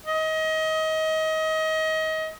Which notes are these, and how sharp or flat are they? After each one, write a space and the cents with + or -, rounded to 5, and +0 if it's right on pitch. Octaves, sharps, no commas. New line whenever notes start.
D#5 +25